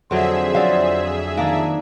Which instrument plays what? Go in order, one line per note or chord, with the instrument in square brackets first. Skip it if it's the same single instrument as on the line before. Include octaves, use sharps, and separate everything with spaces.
[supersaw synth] F2 G#4 E5 [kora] D3 F#3 [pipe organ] C5
[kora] F#3 [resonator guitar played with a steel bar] F4 D5 F5
[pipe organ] D#3 [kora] A#3 D4